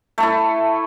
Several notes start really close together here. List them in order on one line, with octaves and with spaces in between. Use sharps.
A3 A4 E4